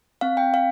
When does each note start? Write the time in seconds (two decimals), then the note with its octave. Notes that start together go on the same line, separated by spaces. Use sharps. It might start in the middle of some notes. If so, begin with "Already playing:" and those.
0.21 C4 F5
0.37 G5
0.43 C4
0.54 F5